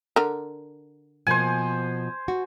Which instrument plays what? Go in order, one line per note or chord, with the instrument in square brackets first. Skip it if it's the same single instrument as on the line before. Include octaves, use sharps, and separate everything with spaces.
[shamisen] D3 A#4
[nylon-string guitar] B2 F3 A#3 [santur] C5 G#5
[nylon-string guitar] F#4